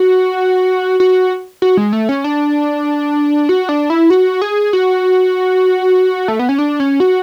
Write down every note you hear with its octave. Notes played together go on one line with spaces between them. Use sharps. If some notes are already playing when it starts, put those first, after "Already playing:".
Already playing: F#4
F#4
F#4
G#3
A3
C#4
D4
F#4
D4
E4
F#4
G#4
F#4
A3
B3
C#4
D4
C#4
F#4